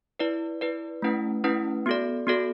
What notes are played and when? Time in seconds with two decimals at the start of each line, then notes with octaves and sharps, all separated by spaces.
0.19 E4 B4 D5
0.61 E4 B4 D5
1.02 A3 C#4 E4 B4 F#5
1.44 A3 C#4 E4 B4 F#5
1.86 B3 F#4 A4 D5
2.27 B3 F#4 A4 D5